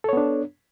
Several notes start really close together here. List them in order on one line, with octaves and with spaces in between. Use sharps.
A4 C#5 B3 D4